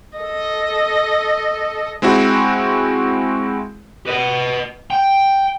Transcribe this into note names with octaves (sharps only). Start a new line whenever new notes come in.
A4 D#5
G#3 C4 E4 F#4
B4 D#5
G5